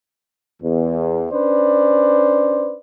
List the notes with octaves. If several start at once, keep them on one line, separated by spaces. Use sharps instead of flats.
E2
C#4 D4 B4 C5 D5